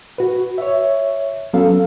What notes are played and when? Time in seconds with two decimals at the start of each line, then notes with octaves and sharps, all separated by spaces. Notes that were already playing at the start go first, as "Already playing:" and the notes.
0.18 F#4 B4
0.58 C#5 E5
1.53 F#3 B3 C#4 A4 F5